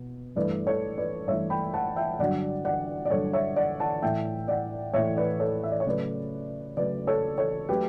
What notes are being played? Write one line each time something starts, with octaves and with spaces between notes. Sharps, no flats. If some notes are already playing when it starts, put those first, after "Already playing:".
Already playing: B2 B3
G2 E3 A3 B4 D5
A4 C#5
B4 D5
G2 E3 A3 C#5 E5
G5 B5
F#5 A5
E5 G5
G2 D3 F#3 D5 F#5
D5 F#5
D5
G2 D3 F#3 A4 C#5
C#5 E5
D5 F#5
F#5 A5
A2 E3 A3 E5 G5
D5 F#5
A2 E3 A3 C#5 E5
B4 D5
A4 C#5
E5
D5
C#5
C#3 F#3 A3 B4 D5
C#3 F#3 A3 B4 D5
A4 C#5
A4 C#5
F#3 A3 G4 B4